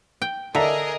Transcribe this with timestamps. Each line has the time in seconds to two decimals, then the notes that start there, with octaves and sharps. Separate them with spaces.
0.22 G5
0.55 D3 D4 G#4 A#4 D#5 E5 A#5